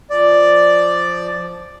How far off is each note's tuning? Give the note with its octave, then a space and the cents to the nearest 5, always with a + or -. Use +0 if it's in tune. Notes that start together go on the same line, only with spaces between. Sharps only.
F3 +0 D5 +0